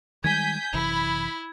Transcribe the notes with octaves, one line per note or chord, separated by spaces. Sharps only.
D#3 G3 G#3 G#5 G6 G#6 B6
F#1 C3 E3 E4 B5